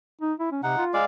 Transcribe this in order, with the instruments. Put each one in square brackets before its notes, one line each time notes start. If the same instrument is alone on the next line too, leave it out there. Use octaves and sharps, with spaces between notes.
[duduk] D#4
E4
C#4
[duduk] C3 [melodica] D#4 F#5
[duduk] F4
[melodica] G#3 D5 F5